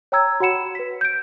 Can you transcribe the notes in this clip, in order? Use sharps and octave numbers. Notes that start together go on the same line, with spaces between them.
C#5 G5 A#5 E6 G#6
F#4 C#5 F#5 B5 C#7 E7
B4 B6
G6 D7